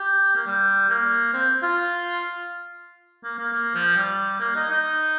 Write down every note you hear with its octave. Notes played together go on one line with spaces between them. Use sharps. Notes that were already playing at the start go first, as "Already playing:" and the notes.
Already playing: G4
A#3
G3
A#3
C4
F4
A#3
A#3
A#3
F3
G3
A#3
D#4
D#4